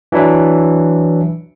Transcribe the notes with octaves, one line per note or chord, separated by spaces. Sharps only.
E3 F#3 D4 E4